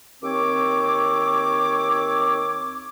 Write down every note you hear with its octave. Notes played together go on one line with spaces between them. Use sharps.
D#2 C4 C#5 D6